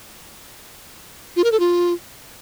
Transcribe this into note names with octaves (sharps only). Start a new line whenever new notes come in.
F4
A#4
A4
F4